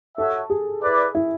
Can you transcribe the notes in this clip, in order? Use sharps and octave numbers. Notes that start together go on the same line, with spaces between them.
F#4 A4 C#5 E5
G#4
E4 B4 D5
E4